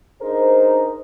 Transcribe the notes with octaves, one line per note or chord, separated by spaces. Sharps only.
D4 D#4 G#4 A#4 C5